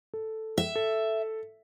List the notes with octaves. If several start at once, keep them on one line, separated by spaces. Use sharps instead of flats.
A4
E5
A4